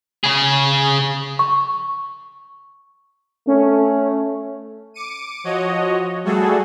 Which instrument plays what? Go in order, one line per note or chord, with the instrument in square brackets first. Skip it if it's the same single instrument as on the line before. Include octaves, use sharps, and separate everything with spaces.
[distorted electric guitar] C#3 G#4
[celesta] C#6
[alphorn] A3 [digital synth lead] C#4
[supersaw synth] D6 C#7 D#7
F3 F#4 C#5 D#5
G3 A3 F#4 G#4 A4